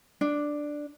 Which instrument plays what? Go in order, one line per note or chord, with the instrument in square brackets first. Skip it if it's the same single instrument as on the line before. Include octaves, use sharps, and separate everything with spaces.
[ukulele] D4